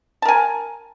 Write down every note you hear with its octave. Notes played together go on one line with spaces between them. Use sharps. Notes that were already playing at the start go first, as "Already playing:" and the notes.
A#4 G#5 A5